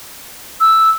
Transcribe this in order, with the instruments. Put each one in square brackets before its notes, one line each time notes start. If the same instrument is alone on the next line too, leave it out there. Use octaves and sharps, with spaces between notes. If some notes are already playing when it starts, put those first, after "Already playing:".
[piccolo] E6